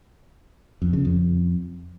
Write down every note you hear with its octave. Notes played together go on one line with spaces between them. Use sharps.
F2
C#3
F2